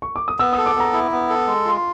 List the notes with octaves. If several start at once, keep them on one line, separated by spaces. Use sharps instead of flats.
C#6
D6
D#6
B3 E6
A4 D#6
D6
B3 A#5
E4
B3
A4
G#3
F4